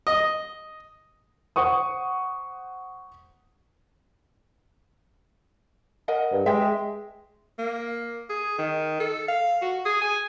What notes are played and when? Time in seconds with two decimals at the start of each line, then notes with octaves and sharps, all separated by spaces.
0.07 D#5
1.56 C5 F#5 C#6 D#6
6.08 A#4 D#5 F#5
6.32 G2
6.46 G#3 E5 G5
7.59 A#3
8.30 G#4
8.59 D#3
9.00 A4
9.28 F5
9.62 F#4
9.86 G#4
10.02 G#5